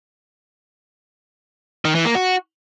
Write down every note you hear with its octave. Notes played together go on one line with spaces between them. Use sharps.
D#3
E3
A#3
F#4